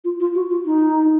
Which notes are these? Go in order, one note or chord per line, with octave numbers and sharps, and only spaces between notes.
F4
F4
F#4
F4
D#4